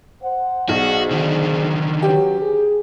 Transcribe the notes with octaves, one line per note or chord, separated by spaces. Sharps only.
C5 F#5
B1 F#4 G#4 C5 D5
D3 D#3
F#3 C#4 G4 B4
G#4